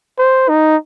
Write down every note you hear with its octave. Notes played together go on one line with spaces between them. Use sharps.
C5
D#4